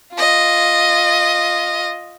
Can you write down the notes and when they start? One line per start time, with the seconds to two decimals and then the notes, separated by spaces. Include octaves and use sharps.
0.14 F4 D#5